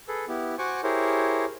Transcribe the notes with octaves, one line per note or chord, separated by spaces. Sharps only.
G#4 A4 B4
B3 E4 G4
F#4 C5 F#5 G#5 C#6 D6
E4 G4 G#4 A#4 C5 C#5